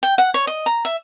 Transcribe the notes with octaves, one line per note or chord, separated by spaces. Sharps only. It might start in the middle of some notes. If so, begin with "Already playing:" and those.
G5
F#5
C#5
D#5
A#5
E5